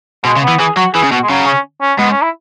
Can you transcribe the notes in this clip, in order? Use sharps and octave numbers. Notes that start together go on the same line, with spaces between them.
B2 G#3
C#3
B3
E3
E3 G#4
F#3 F#4
E3 G#4
C#3
B2 F#4
G#3
C#3 F#3
C#4
C#4
G#2 B3
C#4
E4